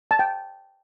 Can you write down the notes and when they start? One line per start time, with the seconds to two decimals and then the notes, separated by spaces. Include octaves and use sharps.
0.11 A5
0.19 G5